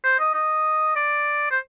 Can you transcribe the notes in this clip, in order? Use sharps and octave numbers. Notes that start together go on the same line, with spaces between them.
C5
D#5
D#5
D5
C5